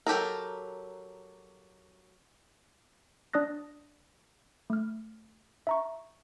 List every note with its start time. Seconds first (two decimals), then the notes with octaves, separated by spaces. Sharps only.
0.07 F#3 G4 A4 A#4
3.33 D4 D5 D#6 F#6 A#6
4.70 A3 F6
5.67 E5 A#5 C#6